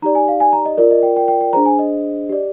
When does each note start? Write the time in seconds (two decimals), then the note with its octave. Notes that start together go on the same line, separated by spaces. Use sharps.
0.02 D#4 G4 D5 A#5
0.15 G#5
0.28 F5
0.40 G#5
0.53 A#5
0.66 D#5
0.77 F4 A#4 D5
0.91 D#5
1.03 G5
1.16 G5
1.28 G5
1.41 G5
1.53 D4 G#4 C5 A#5
1.66 G#5
1.79 D#5
2.29 G4 D5